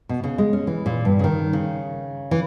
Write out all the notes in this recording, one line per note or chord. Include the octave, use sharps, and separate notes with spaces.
B2
C#3
G#3
C#4
E3
A#2
G2
C#3
D#3
C#3
E3